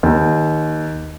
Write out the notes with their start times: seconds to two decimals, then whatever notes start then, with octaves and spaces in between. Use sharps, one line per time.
0.03 D#2